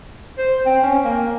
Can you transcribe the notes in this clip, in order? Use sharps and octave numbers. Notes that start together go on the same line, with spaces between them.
C5
C4
C#4
A#3